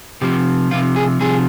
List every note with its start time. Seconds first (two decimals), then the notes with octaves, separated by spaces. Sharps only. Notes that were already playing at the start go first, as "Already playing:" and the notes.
0.21 C3 F3 G4
0.71 C3 F3 F4
0.96 G#4
1.20 C3 F3 G#4